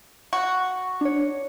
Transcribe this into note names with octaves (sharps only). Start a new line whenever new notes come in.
F#4
D4 C#5